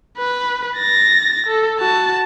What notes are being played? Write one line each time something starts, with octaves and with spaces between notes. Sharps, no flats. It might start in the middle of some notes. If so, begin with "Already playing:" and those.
B4
A6 A#6
A4
F#4 A5